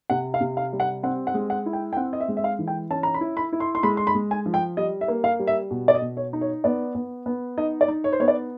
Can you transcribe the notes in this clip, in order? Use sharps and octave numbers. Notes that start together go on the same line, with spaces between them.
C3 F#5
F5
C3
F5
G3
F#5
C4 F#5
F#5
G#3
F#5
E4
G5
G5
C4 F#5
D#5
E5
G#3
E5
F5
E3
G5
C#4 A5
A#5
B5
E4
B5
E4
C6
C6
G#3 B5
C6
B5
G#3
G#5
F3
G5
G3 D#5
E5
A#3
F5
G3
E5
B2
D5
D#5
B2
C#5
D#4
C#5
B3 D5
B3
B3
D#4 D#5
D5
D#4
C#5
C5
B3 C#5
D5